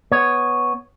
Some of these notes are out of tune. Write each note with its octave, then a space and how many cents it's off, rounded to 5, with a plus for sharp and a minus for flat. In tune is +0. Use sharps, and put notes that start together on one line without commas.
B3 +0 C#5 +0